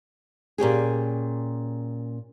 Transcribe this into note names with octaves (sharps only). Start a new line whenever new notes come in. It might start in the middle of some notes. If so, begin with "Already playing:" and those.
A#2 C#4 G4 G#4